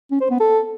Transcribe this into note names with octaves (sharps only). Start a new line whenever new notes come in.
C#4
C5
B3
A4